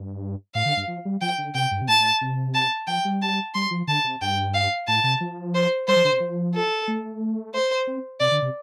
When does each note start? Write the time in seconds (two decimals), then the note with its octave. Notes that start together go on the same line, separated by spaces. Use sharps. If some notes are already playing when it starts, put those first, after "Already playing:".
Already playing: G2
0.54 A2 F5
0.65 D3
0.77 G2
0.88 F3
1.05 G3
1.21 F3 G5
1.38 D3
1.54 C3 G5
1.71 G2
1.81 C3
1.88 A2 A5
2.21 C3
2.54 A5
2.87 F3 G5
3.05 G3
3.22 A5
3.54 G3 C6
3.71 F3
3.87 D3 A5
4.04 C3
4.21 G2 G5
4.54 F5
4.88 A2 A5
5.04 C3
5.21 F3
5.54 C5
5.88 G3 C5
5.96 F3
6.05 D3
6.12 C3
6.20 F3
6.55 A4
6.88 A3
7.54 C5
7.87 C4
8.20 C3 D5
8.31 D3
8.42 C3